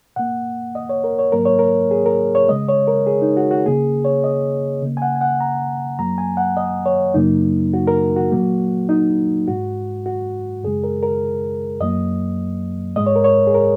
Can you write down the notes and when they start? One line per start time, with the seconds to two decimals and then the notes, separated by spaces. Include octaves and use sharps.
0.16 A#2 A#3 F#5
0.75 D#5
0.89 C#5
1.04 A#4
1.19 C#5
1.32 G#2 F#3 A#3 A#4
1.45 C#5
1.59 A#4
1.91 G#4
2.06 A#4
2.35 C#5
2.49 C#3 G#3 D#5
2.69 C#5
2.88 A#4
3.07 G#4
3.22 D#4
3.37 F#4
3.51 F#4
3.66 C#3 A#3 G#4
4.05 C#5
4.24 D#5
4.82 C#3 A#3
4.97 G#5
5.02 F#5
5.15 G#5
5.21 F#5
5.40 A#5
5.99 F#2 F#3 A#3 A#5
6.18 G#5
6.37 F#5
6.57 D#5
6.86 C#5
7.14 F#2 C#3 F#3 A#3 D#4
7.74 F#4
7.87 A#4
8.16 F#4
8.31 A#2 F#3 A#3
8.89 D#4
9.47 G#2 G#3 F#4
10.06 F#4
10.63 F#2 C#3 G#3 G#4
10.84 A#4
11.03 A#4
11.81 F#2 F#3 A#3 D#5
12.96 G#2 G#3 D#5
13.06 C#5
13.16 A#4
13.24 C#5
13.47 G#4
13.54 A#4